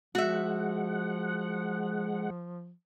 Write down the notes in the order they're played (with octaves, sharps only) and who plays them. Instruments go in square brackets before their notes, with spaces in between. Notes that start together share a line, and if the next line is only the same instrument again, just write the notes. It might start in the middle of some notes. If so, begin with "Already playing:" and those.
[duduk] F3 [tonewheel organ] G#3 F#5 [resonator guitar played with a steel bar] F#4 E5